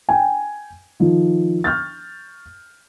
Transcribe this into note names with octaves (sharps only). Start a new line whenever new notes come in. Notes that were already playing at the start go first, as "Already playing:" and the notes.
G5 G#5
D#3 F3
C#6 F6 G6 A6